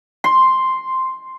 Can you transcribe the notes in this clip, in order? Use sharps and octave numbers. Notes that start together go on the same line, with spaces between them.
C6